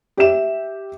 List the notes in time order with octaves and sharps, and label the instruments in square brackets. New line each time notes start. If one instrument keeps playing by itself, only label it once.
[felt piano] G4 E5 E7